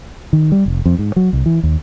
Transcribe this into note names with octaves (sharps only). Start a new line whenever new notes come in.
D#3
G3
F1
F2
G#2
F#3
C2
E3
D#2